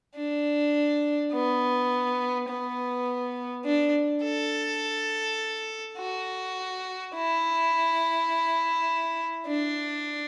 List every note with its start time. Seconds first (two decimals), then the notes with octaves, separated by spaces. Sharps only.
0.16 D4
1.33 B3
2.48 B3
3.65 D4
4.24 A4
5.98 F#4
7.15 E4
9.47 D4